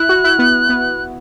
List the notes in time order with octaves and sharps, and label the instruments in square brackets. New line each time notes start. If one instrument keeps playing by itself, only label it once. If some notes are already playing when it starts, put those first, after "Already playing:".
Already playing: [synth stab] E4 [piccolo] F#6
[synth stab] F#4
E4
B3
B3